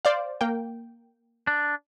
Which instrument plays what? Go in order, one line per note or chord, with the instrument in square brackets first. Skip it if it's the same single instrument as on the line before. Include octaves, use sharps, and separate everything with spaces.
[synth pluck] C5 D5 F5
A#3 G5
[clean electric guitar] D4